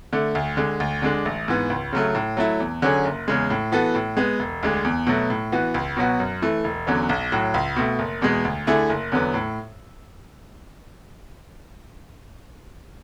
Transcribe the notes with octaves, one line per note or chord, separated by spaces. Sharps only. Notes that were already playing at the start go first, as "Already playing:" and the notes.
D3 A3
D2
D3 G#3
D2
D3 G#3 D4
A1
G#2 E3 B3
C#2
C#3 F#3 A3
A2
F#3 A3 E4
E2
D3 F#3 C#4 G#4
F#1
E2 C#3 G#3
A2
E3 B3 F#4 A4
A2
G#3 B3
E1
D2 D3 G#3
E2
B2 F#3 A3
A2
E3 B3 F#4
C#2
B2 F#3 B3 F#4
F#2
E3 A3
E1
E2 D3 F#3 C#4
B1
A2 F#3
C#2
B2 A3
F#1
E2 B2 G#3
D2
D3 A3 E4 G#4
F#1
E2 D3 F#3 B3
A2